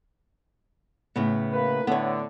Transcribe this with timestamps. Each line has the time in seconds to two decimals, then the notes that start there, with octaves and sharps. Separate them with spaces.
1.16 A2 C#3 B3
1.52 A#3 B4
1.87 A2 D3 B3 C#5